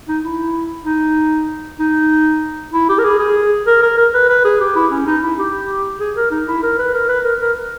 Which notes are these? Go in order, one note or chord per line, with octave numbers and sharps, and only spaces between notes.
D#4
E4
D#4
D#4
E4
G4
A#4
G#4
G#4
A#4
A#4
A#4
B4
B4
G#4
G4
E4
C#4
D#4
E4
G4
G#4
A#4
D#4
E4
A#4
B4
A#4
B4
A#4
A#4